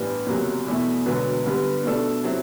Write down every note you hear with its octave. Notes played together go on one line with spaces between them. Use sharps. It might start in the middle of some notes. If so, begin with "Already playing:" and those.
Already playing: A1 G2 E3 B3 D4
F#1 E2 C3 F#3
E2 B2 A3 E4
E1 D2 D3 F#3 B3
G2 D3 G3 B3
B2 A3 D4 A4
C3 F#3 C4 E4